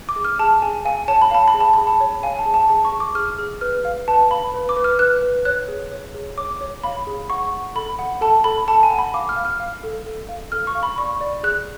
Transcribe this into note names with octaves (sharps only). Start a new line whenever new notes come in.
D6
G#4
F6
G#4 A5
G#4 G#5
F5 G#5
C#5 A5
B5
F5 A5
B5
G#4
A5
G#4 B5
A5
C#5
F5 G#5
A5
G#4
A5
G#4 A5
C#6
G#4
D6
G#4 F6
G#4
B4 F6
F5
B4 A5
F5 B5
B4
D6
B4
F6
B4 F#6
B4
C#5 F#6
G#4
C#5
G#4
C#5 D6
C#5
F5 B5
G#4
F#5 C#6
F#5
A4 B5
F#5
A4 A5
A4 B5
A4 A5
G#5
F#5
B5
F5 D6
F6
F5
F6
F5
A4
A4
F5
A4 F6
C#6
F5
B5
D5 C#6
D5
G#4 F#6